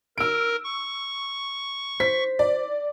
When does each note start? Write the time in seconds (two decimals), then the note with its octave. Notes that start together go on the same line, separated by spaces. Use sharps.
0.18 A#4 E6 D7
0.64 C#6
2.00 C5 B6
2.39 D5